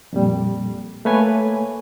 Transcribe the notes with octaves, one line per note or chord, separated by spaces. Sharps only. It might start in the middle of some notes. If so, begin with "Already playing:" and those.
F2 A#2 G3
A3 A#3 B4 C#5 G#5